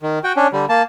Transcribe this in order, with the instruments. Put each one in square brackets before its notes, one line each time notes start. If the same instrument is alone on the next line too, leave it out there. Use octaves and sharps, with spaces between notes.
[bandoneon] D#3
F#4 G5
C#4 D4
D3 G3
A#3 A5